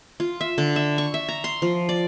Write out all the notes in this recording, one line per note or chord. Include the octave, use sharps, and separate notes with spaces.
F4
E5
D3
E5
C#6
E5
A#5
C6
F3
D5